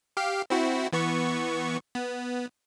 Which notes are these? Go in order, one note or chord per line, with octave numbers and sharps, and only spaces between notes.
G4 F5
C4 E4 F#4
E3 B3 C#6
B3